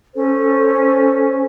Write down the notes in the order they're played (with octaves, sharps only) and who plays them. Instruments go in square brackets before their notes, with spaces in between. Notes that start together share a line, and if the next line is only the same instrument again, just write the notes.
[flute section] C#4 A4 C5